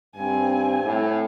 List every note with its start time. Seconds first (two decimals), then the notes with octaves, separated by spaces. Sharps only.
0.16 G2 C4 G#5
0.85 A2